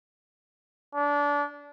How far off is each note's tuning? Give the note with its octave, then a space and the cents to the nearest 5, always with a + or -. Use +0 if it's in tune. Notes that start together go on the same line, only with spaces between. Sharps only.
D4 -25